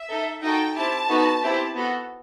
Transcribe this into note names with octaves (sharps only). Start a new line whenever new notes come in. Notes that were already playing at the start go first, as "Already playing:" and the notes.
Already playing: E5
D#4 A4
D#4 F#4 A4 G5
C4 E4 G4 A5
B3 D#4 F#4 A4
C4 E4 G4
B3 F#4 A4